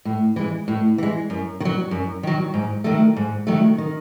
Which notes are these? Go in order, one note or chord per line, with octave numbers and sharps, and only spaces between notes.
A2
E3 G#3
A2
E3 G#3
F#2
D#3
F#3
F#2
D#3 F#3
G#2
D#3 F#3 A3
G#2
D#3 F#3 A3
D#3